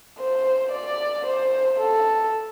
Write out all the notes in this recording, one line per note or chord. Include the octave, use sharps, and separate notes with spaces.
C5
D5
C5
A4